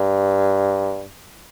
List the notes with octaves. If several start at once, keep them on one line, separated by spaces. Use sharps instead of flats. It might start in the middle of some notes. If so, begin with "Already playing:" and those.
Already playing: G2